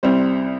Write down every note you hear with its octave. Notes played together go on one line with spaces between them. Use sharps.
C2 C3 G3 C4 C5